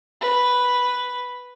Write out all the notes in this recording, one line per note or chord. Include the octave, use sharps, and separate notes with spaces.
B4